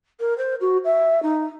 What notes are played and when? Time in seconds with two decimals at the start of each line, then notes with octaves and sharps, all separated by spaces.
0.20 A#4
0.38 C5
0.61 F#4
0.85 E5
1.23 D#4